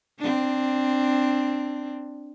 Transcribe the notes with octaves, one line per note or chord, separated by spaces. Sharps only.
C4 D4